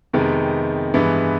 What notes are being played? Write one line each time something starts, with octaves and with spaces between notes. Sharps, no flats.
F2 C3 D#3 G#3 B3
G2 E3 G#3 B3